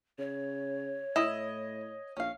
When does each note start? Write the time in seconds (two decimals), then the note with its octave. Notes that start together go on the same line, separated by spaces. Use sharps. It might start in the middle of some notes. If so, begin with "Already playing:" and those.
0.19 C#3 C#5
1.16 A2 E4 D#5
2.17 A#1 C#4 F5